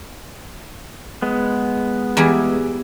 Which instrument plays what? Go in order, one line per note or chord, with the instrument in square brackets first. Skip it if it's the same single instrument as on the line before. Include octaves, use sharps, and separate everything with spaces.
[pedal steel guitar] G#3 B3
[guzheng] E2 G3 E4